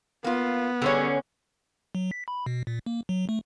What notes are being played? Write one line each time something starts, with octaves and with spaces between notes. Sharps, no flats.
A#3 B3 F4
D3 G3 C4 C#4 G#4
F#3
B6
B5
B2
A#2
A#3
F#3
A3